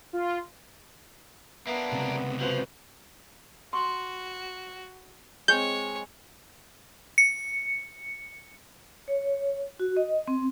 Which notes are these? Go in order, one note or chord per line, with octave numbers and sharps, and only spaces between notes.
F4
A#3 B3 D4 E5 A#5
C#2 C3
F3 F#4 B4 C5
F#4 C6 C#6
G#3 C4 C#5 G6
C#7
C#5
F#4
D#5
C4